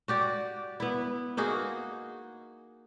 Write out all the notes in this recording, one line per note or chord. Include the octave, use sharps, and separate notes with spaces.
F#4 G4 D5
B3 E4
A#3 D#4 F#4 G#4